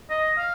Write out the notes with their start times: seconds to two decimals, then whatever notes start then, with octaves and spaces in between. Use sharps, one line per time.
0.10 D#5
0.38 F5